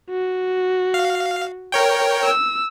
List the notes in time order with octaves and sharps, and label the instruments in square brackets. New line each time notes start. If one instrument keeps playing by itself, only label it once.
[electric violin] F#4
[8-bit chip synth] F5
A#4 C#5 G5
[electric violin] E6